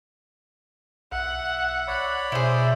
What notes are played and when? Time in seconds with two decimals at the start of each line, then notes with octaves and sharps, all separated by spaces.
1.12 B1 E5 F#5
1.87 C#5 D5 B5
2.32 B2 E4 G#4 C5